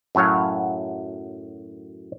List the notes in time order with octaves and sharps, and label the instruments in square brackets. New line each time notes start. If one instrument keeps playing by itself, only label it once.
[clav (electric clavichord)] F#2 A2 F#3 C#5 F5